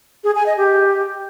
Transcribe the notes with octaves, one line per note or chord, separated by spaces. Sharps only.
G#4
G#5
D#5
G4